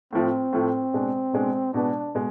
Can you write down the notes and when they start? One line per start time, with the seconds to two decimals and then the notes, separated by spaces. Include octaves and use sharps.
0.13 A2 F3 A3 C4
0.53 A2 F3 A3
0.93 B2 G#3 D4
1.33 B2 G#3 D4
1.74 B2 G#3 B3 D4
2.15 B2 G#3